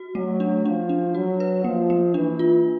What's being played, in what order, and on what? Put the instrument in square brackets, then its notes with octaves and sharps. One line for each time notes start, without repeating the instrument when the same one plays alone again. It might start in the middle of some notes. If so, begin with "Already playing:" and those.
Already playing: [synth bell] F#4
[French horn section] F#3 [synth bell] A3
[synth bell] D4
[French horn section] F3 [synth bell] D4
[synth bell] D4
[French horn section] F#3 [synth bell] F#4
[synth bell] B4
[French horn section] F3 [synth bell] A#3
[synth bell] A#3
[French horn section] E3 [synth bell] D4
[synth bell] F4